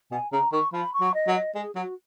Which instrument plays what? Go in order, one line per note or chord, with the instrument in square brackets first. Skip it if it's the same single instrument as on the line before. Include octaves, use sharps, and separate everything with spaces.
[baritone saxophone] B2 [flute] G#5
[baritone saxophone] C#3 [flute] A#5
[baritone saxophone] D#3 [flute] C#6
[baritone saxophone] F3 [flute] B5
[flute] C#6
[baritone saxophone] F#3
[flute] D#5
[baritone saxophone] F#3
[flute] D#5
[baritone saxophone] G#3 [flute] G#4
[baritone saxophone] F#3 [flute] F#4